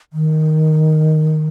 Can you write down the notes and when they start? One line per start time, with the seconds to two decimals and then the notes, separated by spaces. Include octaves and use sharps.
0.13 D#3